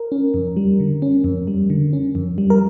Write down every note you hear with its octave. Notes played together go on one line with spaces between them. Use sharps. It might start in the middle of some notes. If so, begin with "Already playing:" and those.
Already playing: A#4
C#4
F2
G3
D3
C#4
F2
G3
D3
C#4
F2
G3
A#4